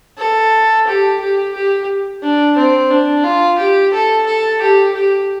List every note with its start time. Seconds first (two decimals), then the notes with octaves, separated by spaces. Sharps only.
0.18 A4
0.87 G4
1.21 G4
1.54 G4
2.23 D4
2.57 C4
2.91 D4
3.24 F4
3.58 G4
3.93 A4
4.27 A4
4.61 G4
4.95 G4